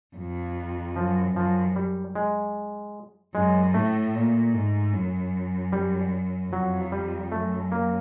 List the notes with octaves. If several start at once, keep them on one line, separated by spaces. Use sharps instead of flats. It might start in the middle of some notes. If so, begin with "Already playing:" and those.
F2
F#2 F3
F#2 F3
G3
G#3
F#2 G#3
A2 A3
A#2
G#2
F#2
G3
F2 F#3
G3
F#2 A3
A#3